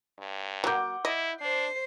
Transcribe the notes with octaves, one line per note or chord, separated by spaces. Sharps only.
G2
F#3 A#3 F#5 D6 G6
E4 D#5
D4 C5 C7